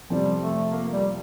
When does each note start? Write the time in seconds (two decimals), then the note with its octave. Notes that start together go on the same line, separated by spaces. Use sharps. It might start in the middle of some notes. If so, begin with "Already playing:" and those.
0.10 F2 C3 F3 G3 C4 F4
0.41 A3
0.71 A#3
0.91 G3